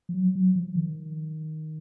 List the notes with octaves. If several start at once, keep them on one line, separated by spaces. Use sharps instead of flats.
F3
F#3
F#3
F3
D#3